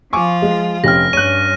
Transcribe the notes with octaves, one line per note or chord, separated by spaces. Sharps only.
F3 F4 G#5 C#6 D6
G#3
F1 C#4 G4 F6 A#6
G2 C#4 C#5 F#6 D#7